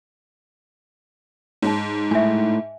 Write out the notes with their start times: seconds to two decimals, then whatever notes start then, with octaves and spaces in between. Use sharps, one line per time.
1.62 G#2 C#5 A5
2.11 A2 E5 G#5